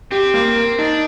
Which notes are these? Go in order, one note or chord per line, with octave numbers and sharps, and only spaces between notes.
C4 G4
A#3
A#4
D4 D#4